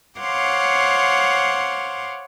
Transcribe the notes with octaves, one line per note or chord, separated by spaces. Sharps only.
C5 C#5 F5 F#5 C6 D6